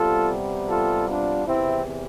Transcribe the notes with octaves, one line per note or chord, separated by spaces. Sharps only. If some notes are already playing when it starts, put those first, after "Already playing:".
Already playing: C3 G3 B3 F4 A4
F4 A4
D4 F4
E2 C3 E3 C4 E4